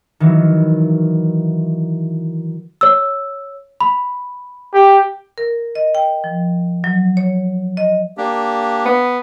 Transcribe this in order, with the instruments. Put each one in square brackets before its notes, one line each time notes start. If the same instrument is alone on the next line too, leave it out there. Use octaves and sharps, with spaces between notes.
[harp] D#3 E3 F#3
[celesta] C#5 E6
B5
[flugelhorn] G4
[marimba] A#4
D#5
G5
F3
F#3
C#5
D#5
[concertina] A#3 D4 G4
[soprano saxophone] B3